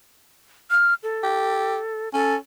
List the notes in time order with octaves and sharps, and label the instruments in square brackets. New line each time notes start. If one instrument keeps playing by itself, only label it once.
[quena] F6
A4
[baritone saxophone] G4
[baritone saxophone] C#4 [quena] A4